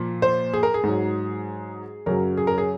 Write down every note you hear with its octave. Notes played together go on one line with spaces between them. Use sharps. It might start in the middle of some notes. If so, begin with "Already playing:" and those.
Already playing: A#2 F3
C5
G#4
A#4
G#4
G#2 F#3
F#2 C#3 F#3 A#4
G#4
A#4
G#4